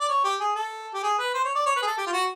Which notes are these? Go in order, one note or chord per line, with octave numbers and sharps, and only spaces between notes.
D5
C#5
G4
G#4
A4
G4
G#4
B4
C5
C#5
D5
C#5
B4
G#4
A4
G4
F4
F#4